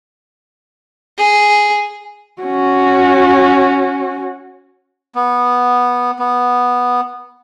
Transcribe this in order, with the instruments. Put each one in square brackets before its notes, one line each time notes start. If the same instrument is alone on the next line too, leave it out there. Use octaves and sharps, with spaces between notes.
[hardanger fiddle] G#4
[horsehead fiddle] C#4 F#4
[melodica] B3
B3